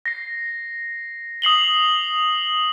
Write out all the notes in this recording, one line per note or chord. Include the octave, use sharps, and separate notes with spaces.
A#6 C7
D#6 C7 F#7 G7